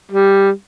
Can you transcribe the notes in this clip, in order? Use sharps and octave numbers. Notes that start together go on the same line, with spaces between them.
G3